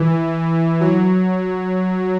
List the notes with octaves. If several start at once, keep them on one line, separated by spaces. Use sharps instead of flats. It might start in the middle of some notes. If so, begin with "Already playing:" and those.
Already playing: E3
F#3